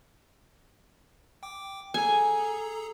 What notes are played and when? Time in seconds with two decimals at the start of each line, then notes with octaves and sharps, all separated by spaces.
1.43 G5 D6
1.94 G#4 A4 G#5 A#5